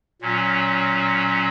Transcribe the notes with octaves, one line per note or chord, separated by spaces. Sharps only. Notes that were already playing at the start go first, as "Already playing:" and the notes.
A#2 F#3 C#4